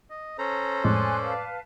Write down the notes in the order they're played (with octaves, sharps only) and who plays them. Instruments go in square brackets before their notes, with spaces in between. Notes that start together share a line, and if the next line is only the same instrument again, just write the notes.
[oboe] D#5
[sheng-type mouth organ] C#4 A4 C5 [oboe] A#5
[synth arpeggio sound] F2 A2 G#3 [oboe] D5 [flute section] G#5 C6 F#6
[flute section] B4 F5 A5